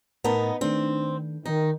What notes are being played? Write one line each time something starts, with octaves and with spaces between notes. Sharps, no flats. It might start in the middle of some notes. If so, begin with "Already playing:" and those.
A2 B3 D#4 A#4 A5
D#3 A3 C4 D4
D#3 D#4